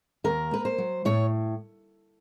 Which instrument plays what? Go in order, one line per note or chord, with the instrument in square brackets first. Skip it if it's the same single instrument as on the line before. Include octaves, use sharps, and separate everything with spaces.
[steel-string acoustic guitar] D#2 A#4
A#3 B4
C5
F#3
A2 C#5